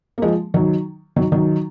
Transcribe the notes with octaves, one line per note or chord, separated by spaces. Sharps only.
A#3
F3 G#3
D#3 F#3
D#3 F#3
D#3 F#3